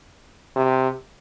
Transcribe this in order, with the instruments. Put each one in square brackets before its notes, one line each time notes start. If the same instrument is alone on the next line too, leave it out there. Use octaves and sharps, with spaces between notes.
[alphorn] C3